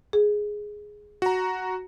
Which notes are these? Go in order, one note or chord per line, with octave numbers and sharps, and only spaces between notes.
G#4
F#4 A#5